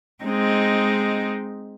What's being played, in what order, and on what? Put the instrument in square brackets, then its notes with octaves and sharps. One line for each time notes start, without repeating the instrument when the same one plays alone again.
[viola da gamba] G#3 C4 D#4